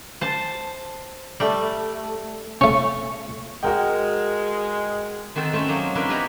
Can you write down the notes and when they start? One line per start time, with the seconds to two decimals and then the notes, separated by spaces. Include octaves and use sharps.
0.21 C5 A5
1.40 G3 A3
2.61 A3 C#4 C#6
3.63 G#3 F#4 A#4 G5
5.36 D#3 C4 F#4 A4
5.53 A3 C4 C#4
5.68 F#3 A#3 D#4 A#5
5.95 C4 D4 E4 A#4 B4
6.09 F#4 G4 B4 C#5 D#5 A#5